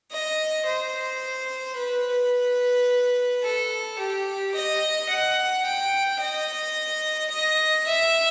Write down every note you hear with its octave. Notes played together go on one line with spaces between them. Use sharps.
D#5
C5
B4
A4
G4
D#5
F#5
G5
D#5
D#5
E5